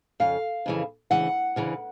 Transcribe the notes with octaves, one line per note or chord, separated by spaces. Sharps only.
F2 C#3 F5
F2 C#3 E3
D2 C#3 E3 F#5
D2 C#3 E3